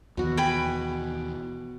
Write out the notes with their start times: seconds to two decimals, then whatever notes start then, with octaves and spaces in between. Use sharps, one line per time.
0.17 D#2 B2 D#3 E3 F#4
0.37 G5 G#5 B5